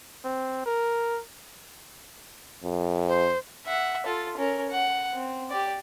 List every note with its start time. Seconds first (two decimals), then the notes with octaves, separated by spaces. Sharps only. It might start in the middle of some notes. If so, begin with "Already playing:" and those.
0.25 C4
0.66 A#4
2.63 F2
3.08 C5
3.66 E5 F#5
4.06 F4 A4
4.37 C#4 A#4
4.71 F#5
5.14 C4
5.50 G4 D5